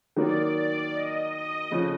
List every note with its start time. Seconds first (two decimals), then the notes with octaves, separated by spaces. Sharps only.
0.16 D#3 F#3 A#3 D5
0.55 D5
0.94 D#5
1.33 D#5
1.71 F2 C#3 F3